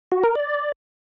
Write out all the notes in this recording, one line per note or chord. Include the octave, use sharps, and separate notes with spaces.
F#4
A#4
D5